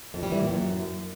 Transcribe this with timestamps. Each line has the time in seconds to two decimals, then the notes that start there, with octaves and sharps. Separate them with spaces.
0.14 F2
0.23 G3
0.32 E3
0.40 A#2
0.49 F#2